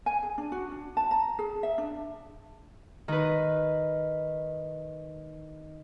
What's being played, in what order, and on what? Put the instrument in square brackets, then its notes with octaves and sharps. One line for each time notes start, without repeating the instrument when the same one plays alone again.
[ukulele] G#5
G#4
D4
F#4
D4
A5
A#5
G#4
E5
D4
[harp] D#3 B4